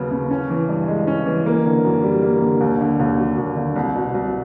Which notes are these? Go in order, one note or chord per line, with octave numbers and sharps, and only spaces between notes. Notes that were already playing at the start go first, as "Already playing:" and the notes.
Already playing: D#2 C#3 F#3 B3
C#3
C#4
E3
G2
G#3
C#4
E3
A#3
D3
F#2
G3
A#3
D3
D#2
D3
D#2
F#3
D#2
D3
C2
B2
C2